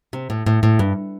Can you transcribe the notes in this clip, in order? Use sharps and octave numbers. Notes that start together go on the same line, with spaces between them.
C3
A2
A2
A2
G2